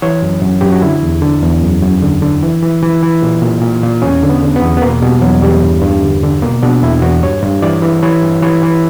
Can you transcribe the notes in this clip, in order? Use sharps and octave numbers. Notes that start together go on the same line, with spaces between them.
E3 C#5
F#2
F#2
F#2 G4
F#4
D3 E4
E2
D3
E2
F#2
F#2
D3
D3
E3
E3
E3
E3
A#2
A#2
A#2
A#2
E2 C#4
D3
B3
D3
B3
E2
B3
B2 A#3
B2 G3
E2 F#3
E2 G3
G2
G2
D3
D3
B2 A#3
B2 D4
E2 E4
E2 F#4
G2 C#5
G2
E3 D5
E3
E3 C#5
G2
E3 C#5
E3